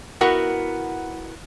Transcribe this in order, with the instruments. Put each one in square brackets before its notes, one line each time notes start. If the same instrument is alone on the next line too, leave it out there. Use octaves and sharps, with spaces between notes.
[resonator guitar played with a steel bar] B3 E4 F#4 A#4 F#5